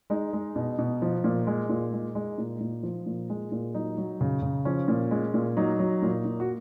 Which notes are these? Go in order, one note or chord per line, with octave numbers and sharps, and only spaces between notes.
G#3 D#4
G#3
B2
B2
F3
A#2
G#3
A#2
G#3
G#3
A#2
A#2
F3
A#2
G#3
A#2
F#3 D#4
F#3
C#3
C#3
F3 C#4
A#2
G#3
A#2
F#3 D#4
F#3
A#2
A#2
F#4